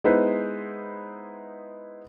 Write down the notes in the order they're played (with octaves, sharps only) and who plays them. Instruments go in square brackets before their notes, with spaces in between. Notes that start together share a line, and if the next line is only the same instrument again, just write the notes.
[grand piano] G#3 B3 D#4 E4 B4 C5